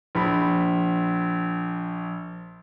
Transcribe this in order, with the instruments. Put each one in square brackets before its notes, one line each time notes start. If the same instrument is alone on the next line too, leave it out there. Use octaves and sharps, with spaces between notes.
[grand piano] A#1 B5